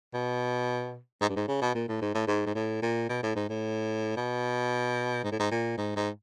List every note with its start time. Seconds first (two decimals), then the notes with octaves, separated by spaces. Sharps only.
0.14 B2
1.21 G#2
1.29 G2
1.36 G#2
1.48 C#3
1.62 B2
1.75 A#2
1.88 A2
2.01 G#2
2.15 A2
2.27 G#2
2.46 G#2
2.55 A2
2.82 A#2
3.09 B2
3.23 A2
3.35 G#2
3.49 A2
4.16 B2
5.24 G#2
5.32 A2
5.39 G#2
5.51 A#2
5.77 G#2
5.96 G#2